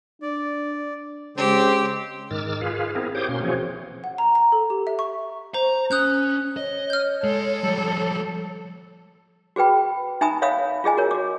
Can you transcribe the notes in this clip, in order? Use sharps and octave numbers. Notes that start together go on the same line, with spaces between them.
D4 D5
C#3 G#3 C4 G4 C5
G#2 D#3 D6 E6 F6 A6
F4 G#4 B4 F5
B3 C4 E4 G#4 A#4
G4 C5 C#5 G5 D6 D#6
B2 A#3 C#4 C6
E3 F3 C4 F#4 G#4 C#5
F#5
A#5
A#5
A4
G4
E5
C#6
C5 A#5
C#4 D#6 F#6 G6
C#5 D#5
F6 G6
G#3 A4
F3 G3
F#4 G#4 B4 G5 B5
D#4 E5 G#5 A#5 B5 D#6
C#5 E5 F5 B5 D#6
F4 G#4 D#5 G#5
F#4 A#4 C#5
F#4 D6